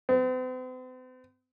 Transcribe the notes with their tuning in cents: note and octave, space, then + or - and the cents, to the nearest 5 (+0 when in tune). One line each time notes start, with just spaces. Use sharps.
C4 -45